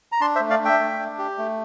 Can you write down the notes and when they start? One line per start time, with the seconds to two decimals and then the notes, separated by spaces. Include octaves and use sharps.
0.12 A#5
0.20 D4 A5 C6
0.35 C5 E5
0.40 A3
0.50 D5 F5
0.60 D4
0.65 E5 G5
0.79 A3
0.99 D4
1.19 G4
1.38 A3